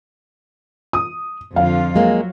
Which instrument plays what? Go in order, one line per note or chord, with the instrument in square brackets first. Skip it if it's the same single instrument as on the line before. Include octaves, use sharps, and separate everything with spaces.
[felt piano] D#6
[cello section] F2 D3 F4 [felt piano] F5
[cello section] F#3 [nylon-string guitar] G#3 A#3